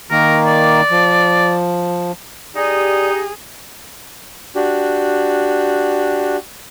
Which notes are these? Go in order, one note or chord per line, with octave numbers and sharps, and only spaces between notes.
D#3 A#3 A#4
D5
F3
D#4 G4 G#4 D5
D4 F#4 G4